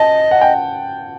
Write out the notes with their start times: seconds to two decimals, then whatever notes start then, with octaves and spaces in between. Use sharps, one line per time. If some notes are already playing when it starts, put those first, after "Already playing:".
Already playing: D#5 A5
0.31 F#5
0.41 G5